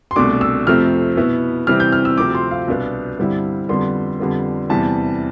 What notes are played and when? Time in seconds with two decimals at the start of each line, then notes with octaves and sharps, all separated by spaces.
0.11 C6
0.16 C2 B2 A3 D4 D6
0.41 E6
0.66 F2 C3 F3 A3 C4 F6
1.17 B2 B3 E4
1.67 C3 E3 G3 C4 E4 F6
1.80 G6
1.92 F6
2.05 E6
2.18 D2 C3 F3 C4 D6
2.35 C6
2.51 F5
2.68 C2 B2 B3 D4
3.18 G2 D3 G3 C4 E4
3.69 F2 D3 G3 B3 C6
4.19 F2 D3 G3 B3
4.69 E2 C3 E3 G3 A5